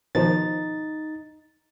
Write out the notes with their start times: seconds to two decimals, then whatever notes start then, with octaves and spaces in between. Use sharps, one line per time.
0.15 B2 D#3 F3 D#4 A6